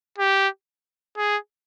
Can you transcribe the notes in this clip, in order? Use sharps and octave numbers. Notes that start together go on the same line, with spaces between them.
G4
G#4